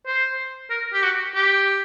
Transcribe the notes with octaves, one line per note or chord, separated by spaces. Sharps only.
C5
A#4
G4
F#4
G4